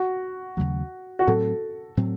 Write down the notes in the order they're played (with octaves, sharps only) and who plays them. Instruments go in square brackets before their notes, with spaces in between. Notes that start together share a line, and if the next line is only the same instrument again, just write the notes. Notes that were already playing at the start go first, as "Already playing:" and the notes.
Already playing: [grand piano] F#4
[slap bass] D#2 C#3 F#3 A3
[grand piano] F#4
[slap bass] A2 F#3 C4 [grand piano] A4
[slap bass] A2 F#3 C4